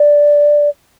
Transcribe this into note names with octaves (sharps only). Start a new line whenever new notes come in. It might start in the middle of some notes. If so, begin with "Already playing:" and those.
Already playing: D5